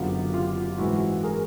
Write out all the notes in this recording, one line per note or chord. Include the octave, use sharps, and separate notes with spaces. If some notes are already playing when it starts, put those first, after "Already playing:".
Already playing: F#1 F#2 D3 F#3 B3 F4 G4
F4 G4
G#2 E3 G#3 C4 E4 F#4
G#4 A#4